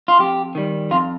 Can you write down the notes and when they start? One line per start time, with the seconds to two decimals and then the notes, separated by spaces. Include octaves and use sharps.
0.08 F4
0.19 F2 G4
0.55 D#3 G3
0.91 F2 F4